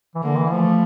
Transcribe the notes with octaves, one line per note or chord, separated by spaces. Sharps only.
E3
D3 A#3
E3
F3 A3